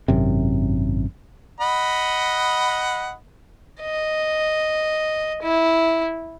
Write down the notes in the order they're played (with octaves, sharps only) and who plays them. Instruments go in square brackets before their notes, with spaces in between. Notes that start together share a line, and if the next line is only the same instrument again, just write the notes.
[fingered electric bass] G#1 F#2 C3
[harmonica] D#5 F#5 B5
[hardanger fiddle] D#5
E4